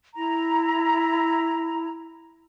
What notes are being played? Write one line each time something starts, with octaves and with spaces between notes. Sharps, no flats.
E4 A#5